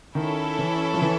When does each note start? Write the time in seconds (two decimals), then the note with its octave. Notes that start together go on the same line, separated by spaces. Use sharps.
0.15 D#3 C#4 E4 A4
0.59 E3
0.94 F3
1.02 E3